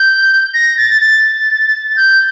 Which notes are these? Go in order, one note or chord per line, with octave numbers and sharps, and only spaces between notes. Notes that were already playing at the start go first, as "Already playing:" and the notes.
Already playing: G6
A#6
A6
A6
G6